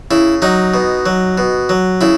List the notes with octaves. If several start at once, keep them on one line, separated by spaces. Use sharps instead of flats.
C#3 E4
F#3 D#4
B2
F#3
B2
F#3
C#3 E4